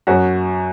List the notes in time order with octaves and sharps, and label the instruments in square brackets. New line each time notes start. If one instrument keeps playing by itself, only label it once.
[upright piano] F#2 F#3 F#4